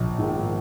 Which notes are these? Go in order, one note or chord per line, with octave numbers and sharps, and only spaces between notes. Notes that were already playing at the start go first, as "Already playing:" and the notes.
Already playing: A#1
G#2 D#3